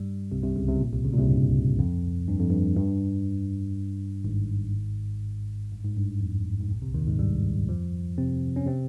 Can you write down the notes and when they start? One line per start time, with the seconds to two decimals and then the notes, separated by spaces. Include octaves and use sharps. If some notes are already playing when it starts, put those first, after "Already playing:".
Already playing: G2 G3
0.32 C2 C3
0.43 C2 C3
0.56 C#2 C#3
0.68 C2 C3
0.80 A#1 A#2
0.93 C2 C3
1.04 C#2 C#3
1.13 A#2
1.17 C2 C3
1.30 G2
1.79 F2
2.28 G2
2.39 F2
2.51 G2
2.77 G2
4.24 G#1 G#2
5.72 G2
5.84 G#2
5.97 G2
6.21 F2
6.60 G#2
6.71 A#1 A#2
6.82 C2 C3
6.94 D#2 D#3
7.07 G#2 G#3
7.19 G2 G3
7.69 F2 F3
8.18 C3 C4
8.56 C#4
8.66 C3 C4